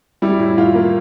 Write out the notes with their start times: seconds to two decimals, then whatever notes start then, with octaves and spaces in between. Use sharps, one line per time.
0.22 G3 E4
0.40 A2
0.58 A2 F4
0.75 A#3